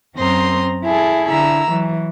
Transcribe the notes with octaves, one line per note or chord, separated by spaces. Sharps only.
F#2 C4 C5 A#5 C6 D#6
E4 G#4 A4
D3 E4 A#5 E6
E3 F#3